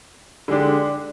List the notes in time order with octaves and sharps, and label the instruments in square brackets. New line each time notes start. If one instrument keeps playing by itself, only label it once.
[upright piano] D3 G#3 D4 G4